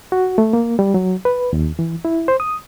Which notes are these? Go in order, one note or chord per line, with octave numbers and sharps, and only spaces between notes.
F#4
A3
A#3
G3
F#3
B4
D#2
E3
E4
C5
D#6